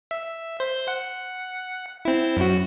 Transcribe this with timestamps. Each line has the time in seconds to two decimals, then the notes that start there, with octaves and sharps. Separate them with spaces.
0.11 E5
0.60 C5
0.88 F#5
2.05 C4 E4
2.37 F#2 F#4